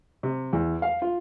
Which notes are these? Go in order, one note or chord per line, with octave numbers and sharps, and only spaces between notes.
C3
E2
F5
F4